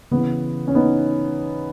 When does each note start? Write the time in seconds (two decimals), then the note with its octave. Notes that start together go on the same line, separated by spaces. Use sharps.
0.11 C#3 E3 B3
0.68 C#4
0.75 B3 D#4